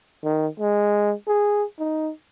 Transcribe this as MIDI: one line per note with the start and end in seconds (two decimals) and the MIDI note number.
0.24 0.48 51
0.60 1.13 56
1.27 1.64 68
1.79 2.11 63